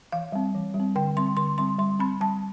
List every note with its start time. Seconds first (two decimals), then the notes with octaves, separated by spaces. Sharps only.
0.12 E3 F5
0.32 G3 C4
0.54 E3
0.74 G3
0.80 C4
0.95 D3 G5
1.16 G3 C4 C6
1.37 D3 C6
1.58 G3 C4 C6
1.79 G3 C6
1.99 C4 B5
2.21 G3 A5